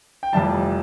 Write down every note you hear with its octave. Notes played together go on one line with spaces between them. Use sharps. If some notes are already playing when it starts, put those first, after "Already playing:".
G5
F1 F2 E3 G3 A5